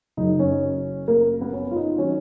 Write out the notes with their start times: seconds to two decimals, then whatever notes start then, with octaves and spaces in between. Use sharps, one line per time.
0.17 F#1 F#2 C#3 D#4
0.39 C#4
1.08 A#3
1.41 B3
1.53 C#4
1.71 F4
1.76 D#4
1.98 D#3 F#3 C#4